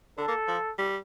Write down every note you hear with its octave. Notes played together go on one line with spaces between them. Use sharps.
D3 A4
A#3
F3
G3